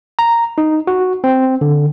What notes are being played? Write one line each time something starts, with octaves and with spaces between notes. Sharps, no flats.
A#5
D#4
F#4
C4
D3